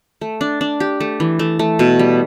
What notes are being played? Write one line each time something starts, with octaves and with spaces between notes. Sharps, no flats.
A3
D4
D4
G4
A3
E3
A3
A3
B2
G3